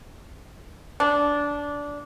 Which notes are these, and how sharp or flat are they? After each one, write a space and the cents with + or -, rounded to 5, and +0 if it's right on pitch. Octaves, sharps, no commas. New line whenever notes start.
D4 -15